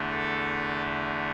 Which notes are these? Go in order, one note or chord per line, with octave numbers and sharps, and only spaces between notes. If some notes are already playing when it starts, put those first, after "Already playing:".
Already playing: E2 D3 A3
A4